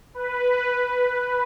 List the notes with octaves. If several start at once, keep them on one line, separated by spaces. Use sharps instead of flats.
B4